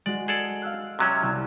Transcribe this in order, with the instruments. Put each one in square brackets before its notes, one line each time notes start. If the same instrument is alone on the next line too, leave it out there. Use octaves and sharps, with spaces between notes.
[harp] G#3 F#4 [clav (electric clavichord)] D5
[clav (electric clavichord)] G#4 A4 D5
[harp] F5 E6 F#6
[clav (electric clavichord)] C3 F#3 C#4
[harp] C2 A5